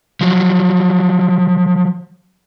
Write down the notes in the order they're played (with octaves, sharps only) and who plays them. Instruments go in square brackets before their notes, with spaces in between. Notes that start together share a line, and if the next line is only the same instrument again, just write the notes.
[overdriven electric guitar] F3 F#3